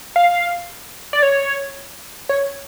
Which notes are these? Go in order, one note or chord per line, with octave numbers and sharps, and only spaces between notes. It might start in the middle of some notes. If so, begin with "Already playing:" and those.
F5
D5
C#5
C#5